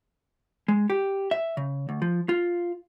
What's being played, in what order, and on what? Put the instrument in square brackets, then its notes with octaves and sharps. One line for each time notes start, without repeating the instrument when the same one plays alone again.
[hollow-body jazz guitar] G#3
G4
E5
C#3
D2
F3
F4